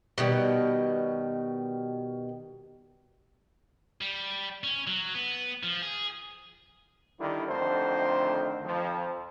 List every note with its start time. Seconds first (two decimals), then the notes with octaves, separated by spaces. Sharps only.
0.18 B2 D#3 G3
4.01 G3
4.64 C#4
4.87 F#3
5.14 B3
5.63 F3
5.82 G#4
7.19 D3 D#3 G3 E4
7.48 F2 D3 D#3 A3 C5
8.64 F2 F3